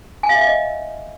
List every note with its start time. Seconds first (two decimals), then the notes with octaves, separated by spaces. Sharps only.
0.23 G#5
0.29 F5
0.35 E5
0.41 F5
0.47 D#5